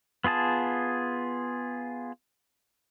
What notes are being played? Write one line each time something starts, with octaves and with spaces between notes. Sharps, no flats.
B3 F4 G#4 A5